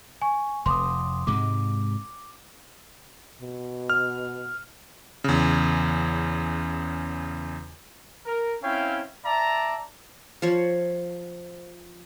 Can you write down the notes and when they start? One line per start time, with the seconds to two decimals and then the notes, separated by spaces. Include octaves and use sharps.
0.22 G#5 C#6
0.66 F1 C6 D6 D#6
1.27 G#2 C3 G#3 D6
3.42 B2
3.90 F6
5.24 E2 C#3
8.26 A#4
8.63 C4 C#4 E4 C#5 F5 G5
9.24 D5 E5 A5 A#5
10.42 F3 C5 C#5